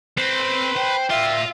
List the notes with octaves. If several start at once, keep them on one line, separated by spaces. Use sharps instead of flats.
C4 B4 C6
C5 G5
F4 D5 E5 F5